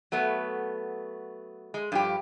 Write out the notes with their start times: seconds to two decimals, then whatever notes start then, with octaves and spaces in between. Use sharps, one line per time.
0.12 F#3 A3 B3
1.74 G#3
1.92 G2 F3 G4